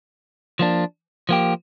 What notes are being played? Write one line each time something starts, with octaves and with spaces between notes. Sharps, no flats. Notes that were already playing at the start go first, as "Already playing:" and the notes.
F3 A#3 D4
F3 A#3 G4